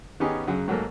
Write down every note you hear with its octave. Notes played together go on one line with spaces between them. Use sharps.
D#3 B3 C#4 D#4 G4 G#4
F#2 C#3 F#3
G#2 F#3 A3 A#3